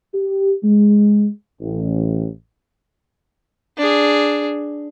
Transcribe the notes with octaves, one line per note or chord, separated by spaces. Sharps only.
G4
G#3
A1
D4 G#4